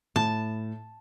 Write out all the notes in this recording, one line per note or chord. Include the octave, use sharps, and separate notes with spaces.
A2 A5